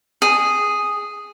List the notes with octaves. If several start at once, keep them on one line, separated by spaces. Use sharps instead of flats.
G#4